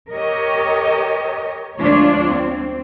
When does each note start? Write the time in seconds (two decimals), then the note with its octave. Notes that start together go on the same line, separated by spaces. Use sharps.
0.12 G4 A#4 C#5 D#5
1.79 D2 F3 G#3 D4 F4 C#5
2.30 C4